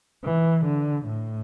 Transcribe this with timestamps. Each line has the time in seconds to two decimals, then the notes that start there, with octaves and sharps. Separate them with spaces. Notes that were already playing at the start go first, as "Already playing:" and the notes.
0.24 E3
0.65 D3
1.06 A2